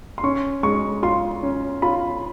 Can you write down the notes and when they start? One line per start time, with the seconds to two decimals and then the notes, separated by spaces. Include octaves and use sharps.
0.18 C6
0.23 C#4 C#6
0.63 G#3 C#6
1.03 F4 C6
1.43 C#4
1.82 F4 B5